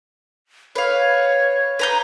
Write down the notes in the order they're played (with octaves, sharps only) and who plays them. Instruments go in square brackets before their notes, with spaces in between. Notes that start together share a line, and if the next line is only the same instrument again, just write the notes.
[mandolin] B4 F5 [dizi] C#5
[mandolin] B4 A#5 G6